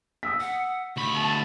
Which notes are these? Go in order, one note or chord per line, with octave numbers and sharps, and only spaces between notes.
D#6 E6 B6
F#5
D2 B5 C#6
A5